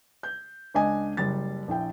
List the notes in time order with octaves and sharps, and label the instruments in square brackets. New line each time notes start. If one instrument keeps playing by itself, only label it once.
[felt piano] G6
C#2 D4 D#5 G#5
F#1 G3 A6
A#1 E4 G5